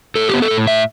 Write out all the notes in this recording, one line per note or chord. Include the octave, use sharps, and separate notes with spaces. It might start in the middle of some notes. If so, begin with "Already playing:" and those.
A2 A4
B3 G4
A4
A2
A2 E5